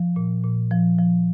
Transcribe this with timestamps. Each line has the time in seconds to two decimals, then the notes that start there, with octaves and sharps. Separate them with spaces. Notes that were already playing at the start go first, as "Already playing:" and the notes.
Already playing: F3
0.16 A#2
0.43 A#2
0.71 F3
0.99 F3